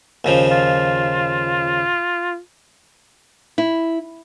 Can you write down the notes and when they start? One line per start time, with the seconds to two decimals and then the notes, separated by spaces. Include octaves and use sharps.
0.25 D#2 C#3 F3
0.51 F4
3.58 E4